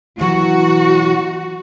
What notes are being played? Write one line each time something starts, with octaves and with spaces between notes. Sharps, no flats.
B2 E3 F#3 F#4